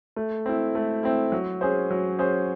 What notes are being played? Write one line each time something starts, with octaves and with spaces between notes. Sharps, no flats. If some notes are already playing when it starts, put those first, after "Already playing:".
A3
C4 E4
A3
C4 E4
F#3
C#4 G#4 C5
F#3
C#4 G#4 C5